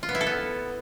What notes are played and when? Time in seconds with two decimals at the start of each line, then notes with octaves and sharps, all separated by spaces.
0.03 F4
0.09 B3
0.15 E4
0.21 A4
0.27 B3